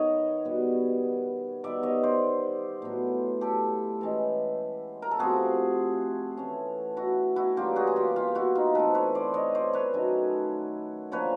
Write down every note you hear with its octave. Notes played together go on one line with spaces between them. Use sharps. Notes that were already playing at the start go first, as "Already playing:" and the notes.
Already playing: D#3 B3 C#5 D#5
B2 G3 B3
D#3 G3 B3 D5 E5
C#5 D#5
C5 D5
A2 F#3 B3
G4 A4
E3 G#3 C#4
A#4
A4
C3 F3 A3 C4 F#4 G#4
E3 A3 C#4
E4 F#4
E4 F#4
E3 G3 A#3 C#4 F4 G4
F#4 G#4
G#4
F4 G4
F4 G4
E4 F#4
D#4 F4
E3 A3 C4 A4 B4
B4 C#5
C5 D5
C#5 D#5
C5 D5
B4 C#5
D#3 F#3 A3 C#4
D3 F3 A#3 C#4 B4 C#5